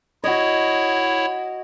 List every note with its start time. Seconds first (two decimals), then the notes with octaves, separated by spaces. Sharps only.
0.24 E4 F#4 C#5 D#5